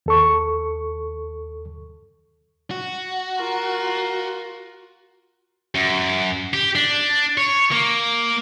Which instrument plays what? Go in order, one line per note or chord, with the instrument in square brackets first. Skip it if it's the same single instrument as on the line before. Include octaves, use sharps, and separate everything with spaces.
[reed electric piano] D#2 A4 C#6
[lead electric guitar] F#4
[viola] F4 A#4
[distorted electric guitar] F#2
G4
D4
C#5
A#3